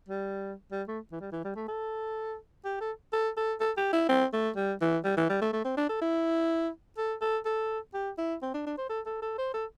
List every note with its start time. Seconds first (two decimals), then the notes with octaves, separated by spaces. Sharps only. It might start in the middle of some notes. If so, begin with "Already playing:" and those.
0.08 G3
0.72 G3
0.88 A3
1.12 E3
1.21 G3
1.32 E3
1.44 G3
1.56 A3
1.68 A4
2.65 G4
2.80 A4
3.13 A4
3.37 A4
3.60 A4
3.77 G4
3.93 E4
4.09 C4
4.33 A3
4.56 G3
4.81 E3
5.04 G3
5.17 E3
5.29 G3
5.42 A3
5.53 A3
5.64 C4
5.77 D4
5.89 A4
6.01 E4
6.97 A4
7.21 A4
7.45 A4
7.94 G4
8.18 E4
8.42 C4
8.54 D4
8.66 D4
8.78 C5
8.89 A4
9.06 A4
9.22 A4
9.38 C5
9.54 A4